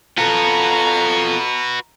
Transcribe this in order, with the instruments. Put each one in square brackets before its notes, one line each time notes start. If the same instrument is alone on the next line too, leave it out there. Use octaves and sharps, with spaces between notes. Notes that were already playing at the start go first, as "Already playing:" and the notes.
[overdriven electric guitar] F4 A4 [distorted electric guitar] F#4 B4 [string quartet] A#5